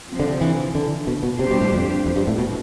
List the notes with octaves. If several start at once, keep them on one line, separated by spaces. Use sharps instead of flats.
C3 F3 C4
D3
E3
D3
B2
B2
C3 G3 D4 G4 C5
B2
A2
F2
F2
G2
A2
B2